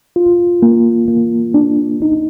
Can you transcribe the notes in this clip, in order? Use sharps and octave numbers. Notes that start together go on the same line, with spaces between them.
F4
A#3
A#3
D4
D#4